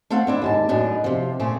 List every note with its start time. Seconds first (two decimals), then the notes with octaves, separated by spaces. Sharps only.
0.10 A3 C4 A4 F5 F#5
0.27 C4 D4 E4
0.42 D#2 G#2 A5
0.69 F#2 A2 D4 D#4
1.04 C3 F3
1.39 A#2 C#3 A3 C4 C#4 G#4